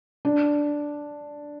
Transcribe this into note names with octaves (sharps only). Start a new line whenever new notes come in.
D4